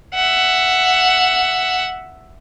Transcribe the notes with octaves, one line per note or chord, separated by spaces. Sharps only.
E5 F#5